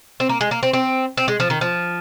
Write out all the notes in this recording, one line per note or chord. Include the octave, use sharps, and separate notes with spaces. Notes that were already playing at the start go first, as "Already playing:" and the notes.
C4
A#3
G#3
A#3
C4
C4
C4
G#3
F3
D#3
F3